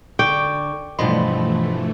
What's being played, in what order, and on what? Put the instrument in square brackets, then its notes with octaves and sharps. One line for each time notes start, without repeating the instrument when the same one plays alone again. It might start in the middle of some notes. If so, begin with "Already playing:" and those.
[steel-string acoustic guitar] D3 [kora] G5 [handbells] C#6 D6 G6
[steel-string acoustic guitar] G2 B2 F3 [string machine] E3 A3 [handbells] D#5 B5 C6